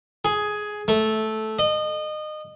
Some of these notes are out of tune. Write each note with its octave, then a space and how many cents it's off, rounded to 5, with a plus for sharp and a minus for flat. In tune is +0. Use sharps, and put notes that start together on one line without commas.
G#4 +10
A3 -10
D#5 -25